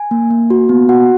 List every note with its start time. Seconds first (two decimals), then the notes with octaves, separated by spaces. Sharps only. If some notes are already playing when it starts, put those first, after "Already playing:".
Already playing: G#5
0.11 A#3
0.31 A#3
0.50 F#4
0.69 B3
0.89 F#4 F#5